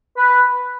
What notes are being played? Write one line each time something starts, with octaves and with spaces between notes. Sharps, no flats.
B4